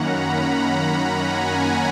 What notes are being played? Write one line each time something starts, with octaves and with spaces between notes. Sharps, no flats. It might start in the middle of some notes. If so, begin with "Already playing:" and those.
Already playing: F#2 D#3 A#3 C#4 F#5 A#5 B5
A#5
G#5
F#5